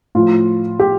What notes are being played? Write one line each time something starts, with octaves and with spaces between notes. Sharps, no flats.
A2 F3 F4
G4